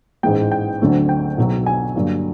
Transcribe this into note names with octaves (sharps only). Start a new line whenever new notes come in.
A1 G#2 E3 G#3 G5
G5
D2 D3 F#3 A3 C4
G5
B1 B2 F#3 B3
G#5
G2 D3 F#3 A#3